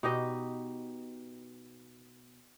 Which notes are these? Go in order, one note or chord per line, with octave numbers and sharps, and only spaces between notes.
B2 D#4 G4 D#5